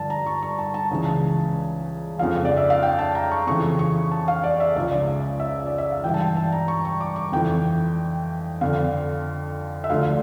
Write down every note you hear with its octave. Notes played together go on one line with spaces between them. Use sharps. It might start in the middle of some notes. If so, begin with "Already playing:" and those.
Already playing: G2 D3 F3 A5
A#5
C#6
C#6
A5
A5
C#2 C#3 E3
F2 C#3 F3 F5
D5
E5
F5
G5
A5
A#5
C#6
F2 C#3 E3 C#6
C#6
A5
F5
D5
E5
C#2 C#3 F3 D5
E5
D5
E5
F5
G2 E3 G5
A5
G5
A5
A#5
C#6
C#6
D6
C#6
F2 E3 G5
F2 D3 F3 F5
E5
D2 D3 F3 F5